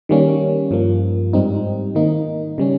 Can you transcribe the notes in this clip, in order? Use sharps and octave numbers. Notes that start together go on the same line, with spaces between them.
D#3 G3 A#3 C#4
G2 F3 A#3
G#2 G3 C4 D#4
D#3 A#3 D#4
C#3 G3 C#4